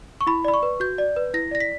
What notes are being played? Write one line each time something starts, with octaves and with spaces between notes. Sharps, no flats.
C#6
E4 B5
D5 B5
C#6
B4
F#4 G6
D5
B4
E4 A#6
D5 A#6
B6